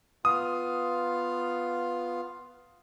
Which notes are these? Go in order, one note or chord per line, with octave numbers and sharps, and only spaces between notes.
B3 F4 F5 D#6